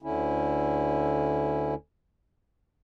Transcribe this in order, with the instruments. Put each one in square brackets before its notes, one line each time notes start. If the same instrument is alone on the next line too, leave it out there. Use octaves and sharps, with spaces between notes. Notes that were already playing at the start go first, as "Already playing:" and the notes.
[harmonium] D2 D3 C#4 E4